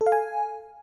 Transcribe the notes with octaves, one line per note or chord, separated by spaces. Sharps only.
A4
F5
G#5